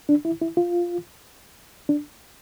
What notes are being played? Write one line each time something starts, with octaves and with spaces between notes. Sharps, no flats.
D4
E4
E4
F4
D4